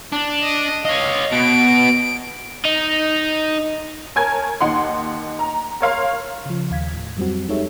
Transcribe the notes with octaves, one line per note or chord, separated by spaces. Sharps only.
D4
D#5
C#5 D#5 F5
B2 D7
D#4
A#4 C#5 G#5 A5 G#6
D#2 D#4 F#5 C6
A#5
A#4 C#5 F5 C6
C#3 F3
D#2 F5 G#6 B6
A2
F2 F#3 G3 C4 F#4
G#3 D#4 G4 A4 C#5 E5